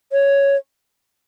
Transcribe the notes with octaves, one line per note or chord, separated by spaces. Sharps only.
C#5